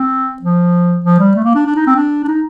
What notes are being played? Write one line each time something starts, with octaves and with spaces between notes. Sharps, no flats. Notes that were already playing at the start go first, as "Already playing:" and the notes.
Already playing: C4
F3
F3
G3
A3
A#3
D4
D4
D#4
C4
D4
D4
D#4